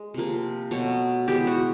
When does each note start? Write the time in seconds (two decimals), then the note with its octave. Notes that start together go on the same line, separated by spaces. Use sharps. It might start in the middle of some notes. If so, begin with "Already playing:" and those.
Already playing: G#3
0.14 C3 F3 A#3
0.71 B2 F#3 A3
1.27 E3 G#3 B3 G4
1.47 F#4